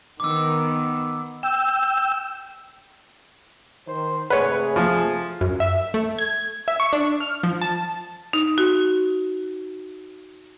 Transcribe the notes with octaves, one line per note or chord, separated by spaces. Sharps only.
D#3 B3 D6 E6
G5 E6
D#3 C5
C3 A3 G#4 B4 C#5
F3
F#2
E5
A3
G#6
E5
C#6
D4
F6
F3
A5
D#4
F#4